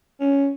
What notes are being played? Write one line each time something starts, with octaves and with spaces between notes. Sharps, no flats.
C#4